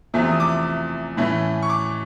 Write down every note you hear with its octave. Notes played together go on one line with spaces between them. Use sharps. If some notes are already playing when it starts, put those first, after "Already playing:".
E2 C3 F3 A3
D#6
D6
A2 E3 A3 C#4
C#6
D6